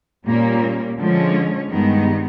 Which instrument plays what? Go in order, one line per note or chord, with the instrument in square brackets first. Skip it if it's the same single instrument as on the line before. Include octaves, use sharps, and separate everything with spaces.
[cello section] A#2 G3 A#3 C#4
D3 F3 G#3 C#4
G2 D#3 G#3 B3